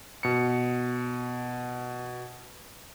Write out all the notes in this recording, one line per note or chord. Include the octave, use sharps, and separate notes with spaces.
B2 C#7